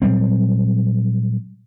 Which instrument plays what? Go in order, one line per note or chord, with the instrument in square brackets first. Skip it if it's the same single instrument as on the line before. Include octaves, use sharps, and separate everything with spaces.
[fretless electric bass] A#2 F#3 G3 C4